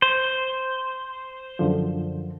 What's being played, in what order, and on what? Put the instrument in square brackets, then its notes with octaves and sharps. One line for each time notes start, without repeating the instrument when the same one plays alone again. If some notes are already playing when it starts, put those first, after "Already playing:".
[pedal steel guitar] C5
[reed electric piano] F#2 D3 F3